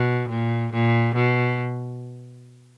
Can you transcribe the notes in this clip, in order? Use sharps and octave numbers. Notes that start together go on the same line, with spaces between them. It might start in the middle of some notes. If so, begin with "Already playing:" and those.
Already playing: B2
A#2
A#2
B2